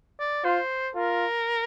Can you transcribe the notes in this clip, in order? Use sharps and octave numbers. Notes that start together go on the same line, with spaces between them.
D5
F4 C5
F4 A#4